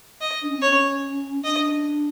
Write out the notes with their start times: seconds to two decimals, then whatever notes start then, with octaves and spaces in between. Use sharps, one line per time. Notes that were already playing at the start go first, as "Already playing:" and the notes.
0.21 D#5
0.42 D4
0.49 C#4
0.57 C4
0.62 C#4 C#5
1.44 D4 D#5